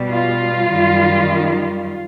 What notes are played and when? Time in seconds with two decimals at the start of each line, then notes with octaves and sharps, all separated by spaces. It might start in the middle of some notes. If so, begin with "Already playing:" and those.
Already playing: B2 G3
0.12 F4
0.70 F#2 D#3 G3